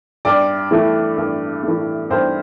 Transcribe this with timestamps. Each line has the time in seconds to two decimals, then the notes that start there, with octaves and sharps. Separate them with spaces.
0.25 G2 D5
0.71 E3 A3
1.17 G2
1.63 E3 A3
2.10 G2 C5